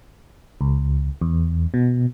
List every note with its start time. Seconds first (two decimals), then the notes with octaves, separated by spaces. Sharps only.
0.61 C#2
1.21 E2
1.74 B2